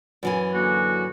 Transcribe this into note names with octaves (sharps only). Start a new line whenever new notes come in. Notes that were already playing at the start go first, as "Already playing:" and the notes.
F#2 E3 G#5
D3 A#3 F#4